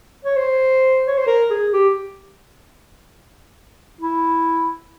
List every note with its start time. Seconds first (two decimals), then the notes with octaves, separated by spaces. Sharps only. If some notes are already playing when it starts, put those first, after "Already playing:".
0.25 C#5
0.36 C5
1.08 C#5
1.17 C5
1.27 A#4
1.51 G#4
1.73 G4
4.01 E4